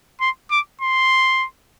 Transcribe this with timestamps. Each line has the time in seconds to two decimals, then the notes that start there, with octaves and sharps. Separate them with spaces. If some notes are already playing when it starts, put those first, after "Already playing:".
0.20 C6
0.51 D6
0.81 C6